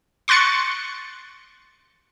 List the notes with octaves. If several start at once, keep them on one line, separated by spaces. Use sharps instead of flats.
C6 C#6 F#6 A6 C#7